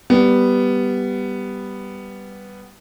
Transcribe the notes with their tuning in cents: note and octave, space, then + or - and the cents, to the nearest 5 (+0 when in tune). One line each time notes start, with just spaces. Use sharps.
G3 +0 B3 +0